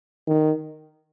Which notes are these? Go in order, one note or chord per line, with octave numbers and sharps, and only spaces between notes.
D#3